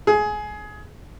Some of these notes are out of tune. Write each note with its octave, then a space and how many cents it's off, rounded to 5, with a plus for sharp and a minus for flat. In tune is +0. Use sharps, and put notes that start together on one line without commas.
G#4 +20